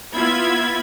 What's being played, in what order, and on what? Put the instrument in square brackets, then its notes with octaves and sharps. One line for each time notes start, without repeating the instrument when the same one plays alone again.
[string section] B3 E4 F4 B5 G#6